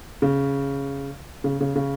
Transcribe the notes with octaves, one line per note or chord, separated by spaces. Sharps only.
C#3
C#3
C#3
C#3